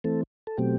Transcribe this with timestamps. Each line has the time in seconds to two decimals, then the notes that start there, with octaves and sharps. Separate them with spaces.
0.04 E3 A3 C4 A4
0.47 A4
0.58 B2 F#3 A3 C4 G4